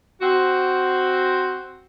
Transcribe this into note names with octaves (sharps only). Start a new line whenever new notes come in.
C4 F#4